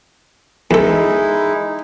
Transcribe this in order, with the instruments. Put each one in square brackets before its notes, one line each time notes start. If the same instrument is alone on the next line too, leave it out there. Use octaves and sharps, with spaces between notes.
[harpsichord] E2 A4 [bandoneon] G#3 D#4 E4